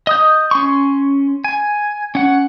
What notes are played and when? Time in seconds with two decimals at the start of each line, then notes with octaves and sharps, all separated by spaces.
0.07 D#5 D#6 G6
0.51 C#4 C6 C#6
1.44 G#5
2.15 C#4 F#5